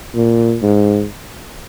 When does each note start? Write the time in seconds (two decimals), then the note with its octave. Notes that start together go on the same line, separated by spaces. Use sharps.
0.15 A#2
0.62 G#2